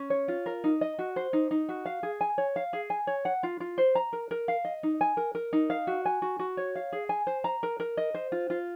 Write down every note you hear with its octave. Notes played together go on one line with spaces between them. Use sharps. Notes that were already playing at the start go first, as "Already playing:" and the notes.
Already playing: C#4
C#5
F4
A#4
D#4
D#5
F#4
C5
D#4
D#4
F#4
F5
G#4
G#5
C#5
F5
G#4
G#5
C#5
F#5
F4
F4
C5
A#5
A#4
A#4
F5
D#5
D#4
G#5
A#4
A#4
D#4
F5
F#4
G#5
F#4
F#4
C#5
F5
G#4
G#5
C5
A#5
A#4
A#4
D#5
C5
F4
F4